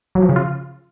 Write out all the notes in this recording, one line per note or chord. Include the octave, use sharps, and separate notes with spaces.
F#3
F3
C#3
F4